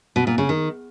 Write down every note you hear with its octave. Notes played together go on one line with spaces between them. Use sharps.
B2
A#2
C#3
D#3